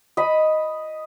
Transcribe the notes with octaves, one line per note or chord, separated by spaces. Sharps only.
D#5 B5